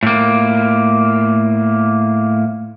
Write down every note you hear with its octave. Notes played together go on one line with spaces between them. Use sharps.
A2 A#3